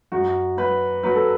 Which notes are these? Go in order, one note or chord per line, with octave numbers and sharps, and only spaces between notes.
F#2 F#4
F#3 B4
F#3 B4
A4